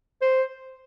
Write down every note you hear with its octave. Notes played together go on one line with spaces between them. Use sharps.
C5